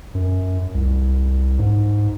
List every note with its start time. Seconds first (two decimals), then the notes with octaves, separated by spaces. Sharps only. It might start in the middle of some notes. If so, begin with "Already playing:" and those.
0.15 F#2
0.74 C2
1.59 G#2